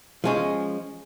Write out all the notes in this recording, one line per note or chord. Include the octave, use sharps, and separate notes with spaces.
F3 G#3 C#4